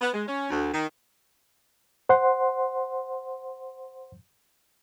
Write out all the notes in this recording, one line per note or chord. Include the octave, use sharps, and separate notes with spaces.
B3
G#3
C#4
D2
D#3
C5 F#5 C6